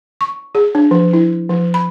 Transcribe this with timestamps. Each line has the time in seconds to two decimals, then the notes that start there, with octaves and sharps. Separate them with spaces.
0.21 C#6
0.55 G#4
0.75 D4
0.91 F3
1.13 E4
1.49 F3
1.74 B5